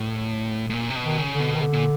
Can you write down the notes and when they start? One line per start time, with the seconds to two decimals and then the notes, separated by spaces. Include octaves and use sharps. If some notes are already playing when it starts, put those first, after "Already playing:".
Already playing: A2
0.70 A2
0.74 A#2
0.90 C3
0.96 B2
1.03 D#3
1.18 C#3
1.32 D3
1.40 B2
1.54 D#3
1.62 D3
1.74 A#2